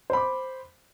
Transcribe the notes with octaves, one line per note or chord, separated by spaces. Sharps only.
C5 B5 D6